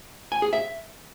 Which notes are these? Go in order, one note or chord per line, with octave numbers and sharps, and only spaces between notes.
G#5
G#4
E5